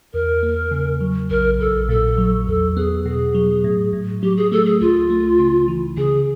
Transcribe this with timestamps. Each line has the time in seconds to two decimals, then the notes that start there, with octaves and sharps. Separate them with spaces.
0.13 E2 A#4
0.43 A#3
0.71 C#3
1.01 F#3
1.30 A#1 A#4
1.59 A#1 A4
1.89 A#2 A4
2.18 F#3
2.47 E2 A4
2.77 B3 G#4
3.06 B2 G#4
3.35 F#3
3.64 A2
3.93 A2
4.23 F#3 G4
4.37 G#4
4.52 A3 A4
4.66 G#4
4.81 C#2 F4
5.10 A3
5.39 C#3
5.68 E3
5.97 C#3 G#4